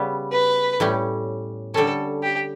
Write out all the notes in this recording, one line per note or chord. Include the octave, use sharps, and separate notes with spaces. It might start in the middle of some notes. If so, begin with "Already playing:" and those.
Already playing: C#3 G3 B3
B4
A2 G3 C#4
D3 G3 C#4 A4
G4